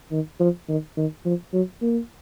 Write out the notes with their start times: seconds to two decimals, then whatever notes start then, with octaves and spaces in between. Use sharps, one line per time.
0.12 D#3
0.40 F3
0.69 D#3
0.97 D#3
1.25 F3
1.53 F#3
1.82 A#3